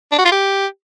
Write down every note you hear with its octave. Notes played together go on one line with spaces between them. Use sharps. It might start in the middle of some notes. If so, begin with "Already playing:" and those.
D4
F#4
F4
G4